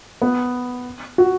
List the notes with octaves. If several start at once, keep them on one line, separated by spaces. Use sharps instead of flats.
B3
F#4